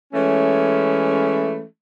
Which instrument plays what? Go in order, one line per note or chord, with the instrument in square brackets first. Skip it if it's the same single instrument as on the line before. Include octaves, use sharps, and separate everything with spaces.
[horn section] E3 G#3 A3 C#4